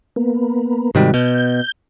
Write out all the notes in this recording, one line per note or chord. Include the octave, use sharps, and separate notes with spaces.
A#3 B3
G#2 C3 D#3 G3 F#4
B2 G6